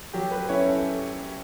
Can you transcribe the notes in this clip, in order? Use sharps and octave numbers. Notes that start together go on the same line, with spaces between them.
F#3 G4
B4
C#4 E4 C#5
A4